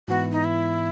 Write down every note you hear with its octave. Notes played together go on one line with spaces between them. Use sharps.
G#2 E3 B3 E4 F#4
D#4
E4